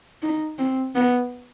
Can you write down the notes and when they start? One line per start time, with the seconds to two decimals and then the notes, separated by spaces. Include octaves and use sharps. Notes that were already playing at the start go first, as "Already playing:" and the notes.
0.23 D#4
0.59 C4
0.95 B3